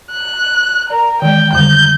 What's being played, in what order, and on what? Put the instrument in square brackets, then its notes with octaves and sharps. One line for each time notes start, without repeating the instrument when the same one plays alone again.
[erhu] F#6
[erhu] A#4 [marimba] D5
[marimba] D#3 E3 G#3 [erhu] G5
[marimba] F2 D3 G3 [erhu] G6